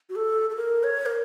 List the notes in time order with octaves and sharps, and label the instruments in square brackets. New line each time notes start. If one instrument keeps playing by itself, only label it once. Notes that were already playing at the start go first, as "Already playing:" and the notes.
[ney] F#4
A4
A4
A#4
C#5
A#4